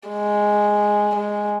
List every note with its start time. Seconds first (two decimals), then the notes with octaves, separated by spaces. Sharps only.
0.09 G#3
1.16 G#3